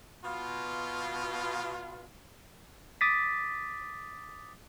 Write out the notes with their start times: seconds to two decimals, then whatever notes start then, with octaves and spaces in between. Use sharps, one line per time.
0.24 B2 F4
3.01 D6 D#6 A6 B6